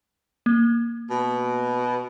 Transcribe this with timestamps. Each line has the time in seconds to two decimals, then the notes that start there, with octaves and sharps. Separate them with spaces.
0.46 A#3
1.10 B2